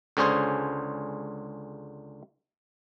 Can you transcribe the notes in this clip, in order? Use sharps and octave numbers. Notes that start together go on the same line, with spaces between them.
C#2 D3 C#4 G#4 C5